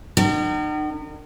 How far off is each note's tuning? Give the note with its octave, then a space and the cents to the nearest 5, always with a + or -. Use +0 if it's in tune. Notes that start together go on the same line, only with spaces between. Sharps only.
D#3 -45